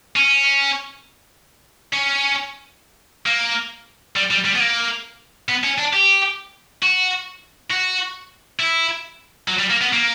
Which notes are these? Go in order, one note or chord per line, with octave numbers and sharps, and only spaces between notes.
C#4
C#4
A#3
G3
G3
G3
B3
A#3
B3
C#4
D4
G4
F#4
F#4
E4
F#3
G3
A#3
B3
A#3